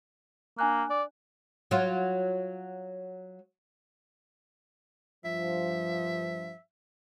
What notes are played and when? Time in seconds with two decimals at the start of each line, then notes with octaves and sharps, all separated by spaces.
0.59 A#3 D4 G#5 F#6
0.90 D5
1.71 F#3 F4
5.25 G2 F3 E5